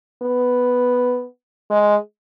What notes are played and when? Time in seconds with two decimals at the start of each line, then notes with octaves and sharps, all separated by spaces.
0.23 B3
1.70 G#3